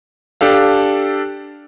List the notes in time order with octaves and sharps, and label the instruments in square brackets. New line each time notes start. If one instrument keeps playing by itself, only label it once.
[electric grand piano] D4 G4 A4 F5